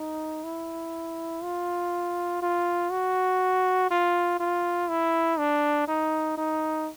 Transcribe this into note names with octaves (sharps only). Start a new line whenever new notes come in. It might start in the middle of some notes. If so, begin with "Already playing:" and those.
Already playing: D#4
E4
F4
F4
F#4
F4
F4
E4
D4
D#4
D#4